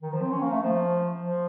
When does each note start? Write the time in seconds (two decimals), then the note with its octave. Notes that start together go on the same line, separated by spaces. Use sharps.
0.02 D#3
0.12 F3
0.22 C4
0.32 C#4
0.42 A#3
0.52 A3
0.63 F3
1.22 F3